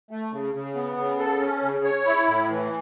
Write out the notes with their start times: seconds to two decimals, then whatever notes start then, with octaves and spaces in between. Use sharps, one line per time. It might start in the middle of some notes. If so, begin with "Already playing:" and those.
0.11 A3
0.32 C#3
0.54 C#3
0.75 B3
0.97 C#3
1.19 A4
1.41 C#4
1.62 C#3
1.85 C#5
2.06 E4
2.27 A2
2.50 E3